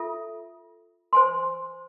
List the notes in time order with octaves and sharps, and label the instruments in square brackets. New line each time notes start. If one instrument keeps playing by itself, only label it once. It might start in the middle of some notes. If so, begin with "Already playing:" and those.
Already playing: [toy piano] F4 A4 E5
C5 G#5 C6